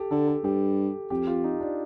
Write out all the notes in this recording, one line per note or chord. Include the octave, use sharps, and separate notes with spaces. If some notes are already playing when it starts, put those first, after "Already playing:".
Already playing: G4 A4
D3 A4
A4
G2 G4
F2 G4
F4
D#4
D4